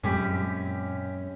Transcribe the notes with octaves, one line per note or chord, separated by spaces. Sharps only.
F#2 A#2 G#3 C4 C#4 G4 B5